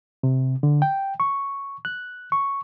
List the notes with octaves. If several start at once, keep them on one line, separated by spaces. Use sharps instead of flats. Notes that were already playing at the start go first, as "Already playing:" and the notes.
C3
D3
G5
C#6
F#6
C#6